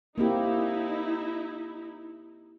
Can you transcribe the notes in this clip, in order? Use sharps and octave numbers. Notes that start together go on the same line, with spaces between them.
A#3 C4 D#4 E4 G4